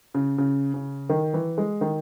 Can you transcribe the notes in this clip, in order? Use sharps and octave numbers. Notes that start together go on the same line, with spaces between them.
C#3
C#3
C#3
D#3
E3
G#3
D#3